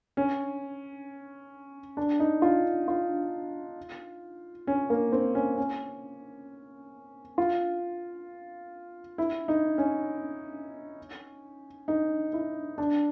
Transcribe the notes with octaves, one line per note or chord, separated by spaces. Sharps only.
C#4
D4
D#4
F4
F4
C#4
A#3
C4
C#4
C#4
F4
E4
D#4
C#4
D#4
E4
D4